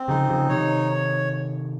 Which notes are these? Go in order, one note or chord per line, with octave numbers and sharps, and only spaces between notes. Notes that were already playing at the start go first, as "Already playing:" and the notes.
Already playing: C4
C#3 F3 D#4
C#3 F3
C3 D#3 C#5